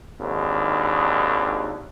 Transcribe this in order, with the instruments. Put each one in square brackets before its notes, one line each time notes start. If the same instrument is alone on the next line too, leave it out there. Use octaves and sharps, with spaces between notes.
[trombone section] G#1 D#2 D4